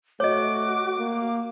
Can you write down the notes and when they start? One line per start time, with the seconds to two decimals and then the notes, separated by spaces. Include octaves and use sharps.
0.20 A3 F#4 C#5 D#5 D6
0.99 A#3